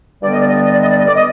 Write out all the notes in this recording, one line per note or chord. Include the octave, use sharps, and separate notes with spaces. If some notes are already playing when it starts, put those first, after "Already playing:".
G2 D3 G3 B3 D5
D#5
D5
D#5
D5
D#5
D5
D#5
D5
D#5
D5
D#5